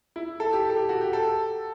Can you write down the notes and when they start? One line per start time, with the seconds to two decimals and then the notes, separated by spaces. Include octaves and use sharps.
0.16 E4
0.40 A4
0.53 G4
0.70 A4
0.77 G4
0.89 F#4
1.01 G4
1.13 A4